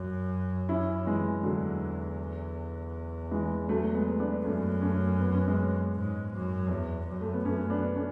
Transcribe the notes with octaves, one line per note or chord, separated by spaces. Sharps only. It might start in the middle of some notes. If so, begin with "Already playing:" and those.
Already playing: F#2
C#4 E4
E3 G#3
E2 D3 F#3
E3 G#3
F#3 A3
G#3 B3
B3 D4
F#2 A3 C#4
A3 C#4
B3
C#4
G#3 B3
G#2
F#2
E2
F#2
A3
B3
F#2 A3 C#4
B3 D4
A3 C#4